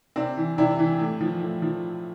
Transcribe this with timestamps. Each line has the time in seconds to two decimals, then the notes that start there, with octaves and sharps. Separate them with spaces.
0.16 C3 C4 D4
0.37 E3
0.58 C3 D4 E4
0.79 E3
0.99 A2
1.21 F3
1.41 A2
1.62 F3